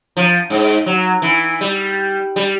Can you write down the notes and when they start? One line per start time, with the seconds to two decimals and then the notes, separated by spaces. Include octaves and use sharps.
0.17 F3
0.50 G#2
0.86 F#3
1.22 E3
1.61 G3
2.36 G3